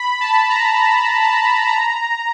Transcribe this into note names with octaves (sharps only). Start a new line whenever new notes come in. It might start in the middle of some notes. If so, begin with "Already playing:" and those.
Already playing: B5
A5
A#5
A5
A#5